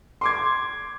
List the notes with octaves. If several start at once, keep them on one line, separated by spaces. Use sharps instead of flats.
C6 D6 G#6